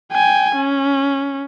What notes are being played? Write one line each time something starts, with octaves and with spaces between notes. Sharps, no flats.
G5 G#5
C#4